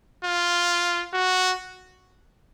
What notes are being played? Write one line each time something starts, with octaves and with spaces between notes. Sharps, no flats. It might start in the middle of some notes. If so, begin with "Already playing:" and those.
F4
F#4